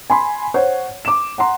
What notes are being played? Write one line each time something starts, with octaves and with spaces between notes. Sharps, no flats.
G#5 B5 C6
C5 C#5 F#5
D6 E7
F#5 A#5 C6